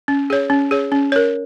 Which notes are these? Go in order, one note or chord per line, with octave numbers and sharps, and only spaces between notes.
C#4
G#4 C#5
C#4
G#4 C#5
C#4
A#4 C#5